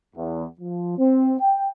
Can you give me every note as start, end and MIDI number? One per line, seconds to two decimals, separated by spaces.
0.16 0.44 40
0.60 0.94 53
0.97 1.35 60
1.39 1.67 79